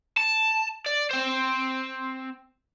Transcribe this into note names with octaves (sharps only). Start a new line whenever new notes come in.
A5
D5
C4 C5